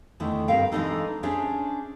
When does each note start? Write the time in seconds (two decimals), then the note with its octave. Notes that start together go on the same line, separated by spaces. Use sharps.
0.20 E2 D3 D#3 A3 E4
0.48 G2 C3 A#4 F5 G5
0.72 E3 G#3 C4 D4 D#4 A4
1.23 C#4 D4 G#4 C5 C#5 E5